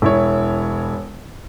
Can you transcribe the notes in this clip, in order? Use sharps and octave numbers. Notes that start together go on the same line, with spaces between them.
E1 E4 C#5